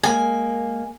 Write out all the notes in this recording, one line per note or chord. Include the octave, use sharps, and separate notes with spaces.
G#3 A#3 G#5